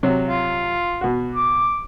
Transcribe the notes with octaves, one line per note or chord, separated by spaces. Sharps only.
C3 F#3
F4
B2 F#4
D6